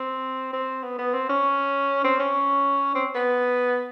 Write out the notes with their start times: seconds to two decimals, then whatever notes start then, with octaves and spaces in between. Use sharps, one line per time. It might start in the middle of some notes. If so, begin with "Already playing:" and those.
Already playing: C4
0.53 C4
0.84 B3
0.99 B3
1.14 C4
1.29 C#4
2.04 C4
2.19 C#4
2.95 C4
3.15 B3